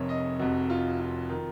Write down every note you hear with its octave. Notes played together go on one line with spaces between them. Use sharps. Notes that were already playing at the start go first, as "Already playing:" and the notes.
Already playing: F1 F2 C3 A#4 C#5
D#5
F1 F2 C3 F#4
F4
F4
D#3